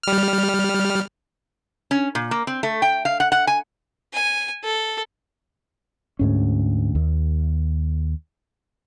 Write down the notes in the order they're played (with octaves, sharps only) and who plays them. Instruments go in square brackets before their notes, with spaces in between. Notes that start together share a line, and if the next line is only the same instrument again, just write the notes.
[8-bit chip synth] G3 F6
[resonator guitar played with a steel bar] C#4
A#2
A#3
C4
A3
G5
F5
F#5
F#5
G#5
[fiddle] G#5
A4
[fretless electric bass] D2 G#2 C#4
D#2